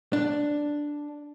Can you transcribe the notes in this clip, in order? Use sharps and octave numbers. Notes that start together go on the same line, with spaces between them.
D4